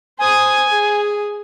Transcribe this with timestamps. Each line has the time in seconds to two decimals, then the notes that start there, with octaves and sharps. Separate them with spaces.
0.19 C5 G#5 D#6
0.69 G#4